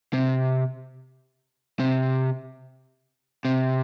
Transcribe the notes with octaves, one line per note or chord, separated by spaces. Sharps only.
C3
C3
C3